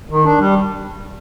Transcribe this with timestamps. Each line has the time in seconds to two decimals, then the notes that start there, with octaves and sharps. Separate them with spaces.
0.10 D#3
0.25 D4
0.39 G3